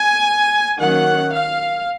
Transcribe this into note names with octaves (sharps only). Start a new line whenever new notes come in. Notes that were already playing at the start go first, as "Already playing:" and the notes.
Already playing: G#5
D#3 F#3 A#3 C#4 F#5
F5